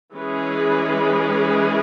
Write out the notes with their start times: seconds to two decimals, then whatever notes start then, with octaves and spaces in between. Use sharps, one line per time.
0.14 E3 G#3 C#4 G#4 B4